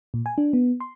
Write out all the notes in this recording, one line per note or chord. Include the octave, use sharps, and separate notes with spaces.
A#2
G#5
D4
B3
C6